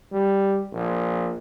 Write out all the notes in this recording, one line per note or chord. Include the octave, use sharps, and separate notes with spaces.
G3
A#1